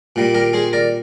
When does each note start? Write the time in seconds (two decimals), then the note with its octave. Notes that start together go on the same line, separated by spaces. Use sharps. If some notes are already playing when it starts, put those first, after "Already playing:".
0.16 A#2 G3 A#3
0.34 G4 A#4
0.53 G#4 C5
0.73 A#4 D5